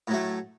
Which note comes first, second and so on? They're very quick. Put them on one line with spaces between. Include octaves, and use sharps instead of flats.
A2 F#3 A3